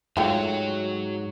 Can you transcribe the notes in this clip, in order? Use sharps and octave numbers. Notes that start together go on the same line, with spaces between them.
G#2 F#3 A3 F4 F#4 C#5 G5